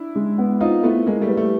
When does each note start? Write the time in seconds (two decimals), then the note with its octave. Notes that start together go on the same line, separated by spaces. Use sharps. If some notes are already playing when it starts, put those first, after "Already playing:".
Already playing: D4 E4
0.15 G#3
0.38 B3
0.61 C4 D#4 F4
0.83 A3 B3 E4
1.06 G#3 A#3 E4
1.21 G3 A3
1.29 B4
1.36 G3 A3